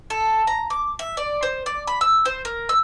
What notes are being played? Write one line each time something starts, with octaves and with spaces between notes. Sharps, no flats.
A4
A#5
D6
E5
D5
C5
D5
B5
E6
C5
A#4
E6